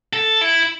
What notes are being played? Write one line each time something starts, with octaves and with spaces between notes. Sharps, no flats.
A4
E4